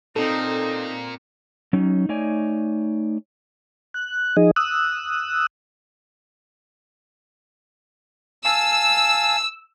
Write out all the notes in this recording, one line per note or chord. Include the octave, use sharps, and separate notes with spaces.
A#2 C4 D#4 A4
F#3 C#4 D#4
A3 D#4 C#5 D5 G#5
F#6
F3 D#4 G#4 D#5
D#6 E6 F#6
F5 G#5 A5 E6